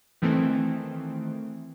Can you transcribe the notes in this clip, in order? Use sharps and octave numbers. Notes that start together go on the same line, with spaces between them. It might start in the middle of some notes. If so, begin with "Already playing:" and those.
D#3 E3 A3 C4